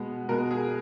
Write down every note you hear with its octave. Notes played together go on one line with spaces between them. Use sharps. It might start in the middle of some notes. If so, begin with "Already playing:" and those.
Already playing: B2 G#3 B3
B2 G#3 B3 A#4
G#4